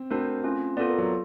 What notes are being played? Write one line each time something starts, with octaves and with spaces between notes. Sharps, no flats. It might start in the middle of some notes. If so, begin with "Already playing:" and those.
Already playing: C4
A3 C4 D4 F#4 A#4
A3 C#4 F4
B3 F4 A4 D5
A#3
F#3